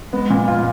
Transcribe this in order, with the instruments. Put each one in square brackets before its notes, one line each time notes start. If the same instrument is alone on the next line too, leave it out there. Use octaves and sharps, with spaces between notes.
[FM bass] G#3 [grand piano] B3
[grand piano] A#2
F4